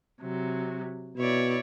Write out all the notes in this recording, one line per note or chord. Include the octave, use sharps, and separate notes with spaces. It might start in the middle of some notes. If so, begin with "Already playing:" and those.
C3 F#3
B2 E4 C#5 D5